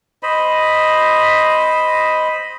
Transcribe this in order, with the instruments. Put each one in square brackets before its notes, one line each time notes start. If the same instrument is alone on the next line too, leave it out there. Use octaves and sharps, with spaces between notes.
[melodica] C5 D#5 B5